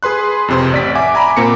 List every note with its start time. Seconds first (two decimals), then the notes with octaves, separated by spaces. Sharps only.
0.03 G#4 B4 C6 F#6
0.48 F2 C3 C5
0.72 A1 D5 B6
0.95 E5 F#5 G#5 D6
1.15 G#5 A#5 B5
1.36 A#2 A#3 C4 A#5 C#7